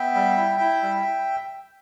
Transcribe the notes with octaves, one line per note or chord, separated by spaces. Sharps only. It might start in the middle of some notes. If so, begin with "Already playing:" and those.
Already playing: B3 E5 G5
G3
E4
E4
G3